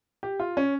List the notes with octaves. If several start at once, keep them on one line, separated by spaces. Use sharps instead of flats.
G4
F4
C#4